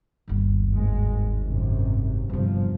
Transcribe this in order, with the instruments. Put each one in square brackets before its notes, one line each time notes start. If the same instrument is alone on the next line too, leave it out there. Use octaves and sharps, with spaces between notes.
[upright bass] G1 D#2
[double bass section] G#1 G#2 G#3
G#1 F#2 C3
[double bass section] G1 C3 F3 [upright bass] E2 G3